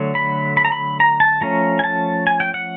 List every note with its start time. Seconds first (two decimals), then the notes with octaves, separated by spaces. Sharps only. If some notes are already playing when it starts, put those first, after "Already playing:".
Already playing: D3 F#3 A3
0.15 B5
0.57 B5
0.65 A#5
0.72 B5
1.00 A#5
1.20 A5
1.41 F3 A3 C#4 A#5
1.79 G#5
1.84 A5
2.27 G#5
2.40 G5
2.54 F#5